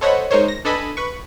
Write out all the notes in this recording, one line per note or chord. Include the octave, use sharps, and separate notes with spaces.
A4 C5 C#5 D#5 F#5 B5
G#3 D#4 A#4 C5 C#5
A#6
D4 A4 B4 D#5 G#5 B5
B4 C#6